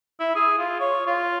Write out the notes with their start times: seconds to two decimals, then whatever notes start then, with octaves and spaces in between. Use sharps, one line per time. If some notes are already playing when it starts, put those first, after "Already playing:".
0.20 E4
0.35 G#4
0.58 F4
0.80 C#5
1.07 F4